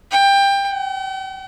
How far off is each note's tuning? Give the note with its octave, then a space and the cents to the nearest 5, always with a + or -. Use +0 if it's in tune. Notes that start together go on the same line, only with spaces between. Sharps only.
G5 +20
G5 -45